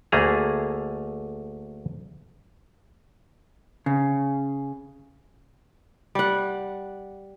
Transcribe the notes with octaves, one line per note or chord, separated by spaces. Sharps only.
D2 A3 A#3 G#4 A#5
C#3
G3 F#5